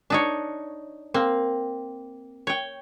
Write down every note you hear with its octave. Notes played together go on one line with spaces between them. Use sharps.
D4 D#4 C#5
A#3 C4
C#5 G5